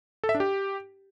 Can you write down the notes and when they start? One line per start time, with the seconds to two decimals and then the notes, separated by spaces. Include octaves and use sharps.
0.24 A4
0.29 E5
0.35 D4
0.40 G4